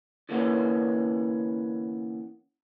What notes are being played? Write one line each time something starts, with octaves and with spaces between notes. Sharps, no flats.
D3 E3 A#3 B3 C#4